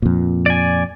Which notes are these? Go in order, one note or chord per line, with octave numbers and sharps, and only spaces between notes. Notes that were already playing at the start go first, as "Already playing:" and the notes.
F2 A#2
D5 G#5